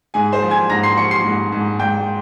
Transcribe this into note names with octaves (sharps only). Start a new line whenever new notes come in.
G#2 G#4 G#5
C5 C6
F3
G#5 G#6
G#2 A#5 A#6
C6 C7
F3 C#6 C#7
C6 C7
G#2
G#2
G#2 G5 G6